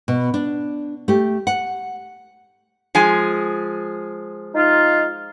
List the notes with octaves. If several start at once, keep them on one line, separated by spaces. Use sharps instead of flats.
B2
D4
A3 G4
F#5
F3 G#3 G#5
D#4 F4